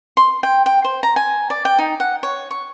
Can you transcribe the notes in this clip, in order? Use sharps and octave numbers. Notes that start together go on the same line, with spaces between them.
C6
G5
G5
C5
A#5
G#5
D5
G5
D#4
F#5
C#5
C#6